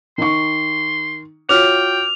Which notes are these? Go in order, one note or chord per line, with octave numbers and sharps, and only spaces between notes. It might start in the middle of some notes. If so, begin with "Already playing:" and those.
D#3 D#4 C6 C#6
F4 F#4 C#5 G5 D6 F6 F7